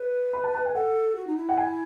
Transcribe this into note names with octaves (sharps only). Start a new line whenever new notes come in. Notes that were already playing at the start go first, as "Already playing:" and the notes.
Already playing: B4
B5
A5
A5
G#5
A4 F#5
F#4
D#4
E4
F#5
G#5